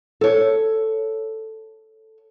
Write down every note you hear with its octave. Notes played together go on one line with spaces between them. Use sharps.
A4 C#5